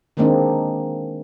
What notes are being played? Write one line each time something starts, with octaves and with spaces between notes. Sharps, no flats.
D#3 G#3 A#3 C4 D4 D#4